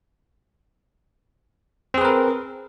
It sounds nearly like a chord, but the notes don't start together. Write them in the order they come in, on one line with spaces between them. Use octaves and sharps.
C4 G#4 B4 A#4